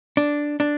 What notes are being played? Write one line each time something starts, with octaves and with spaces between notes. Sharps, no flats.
D4
D4